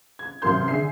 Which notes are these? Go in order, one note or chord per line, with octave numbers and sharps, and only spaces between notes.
G#6
A1 C3 F#3 A#4 C6 G6
D3 G#4 E5 C7